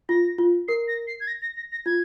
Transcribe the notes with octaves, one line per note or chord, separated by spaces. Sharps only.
F4 A#6
F4
A#4 C7
A#6
C7
G#6
A#6
A#6
A#6
A#6
F4 G#6